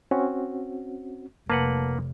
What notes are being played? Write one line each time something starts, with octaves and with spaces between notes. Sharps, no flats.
C4 C#4 F#4
F1 A#3 B4 F#5 A5